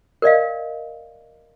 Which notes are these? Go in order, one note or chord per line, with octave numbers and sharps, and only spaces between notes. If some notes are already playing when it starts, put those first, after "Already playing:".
A#4 D5 D#5 F5